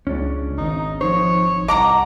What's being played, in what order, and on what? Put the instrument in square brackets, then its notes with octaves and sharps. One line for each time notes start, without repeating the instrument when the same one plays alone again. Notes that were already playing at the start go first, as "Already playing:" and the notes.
[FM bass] C#2 [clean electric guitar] C#4 D4
[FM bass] G#1 [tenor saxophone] D#4
[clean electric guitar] F3 D#4 C5 [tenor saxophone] C#5
[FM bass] C2 [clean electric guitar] D#5 A5 [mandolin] F#5 A#5 D6